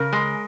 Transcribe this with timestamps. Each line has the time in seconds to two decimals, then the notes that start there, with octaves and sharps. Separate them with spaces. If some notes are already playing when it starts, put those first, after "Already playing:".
Already playing: C#3 A#4
0.13 G#3